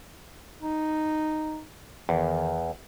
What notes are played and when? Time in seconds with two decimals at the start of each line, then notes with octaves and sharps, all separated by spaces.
0.63 D#4
2.09 E2 D#3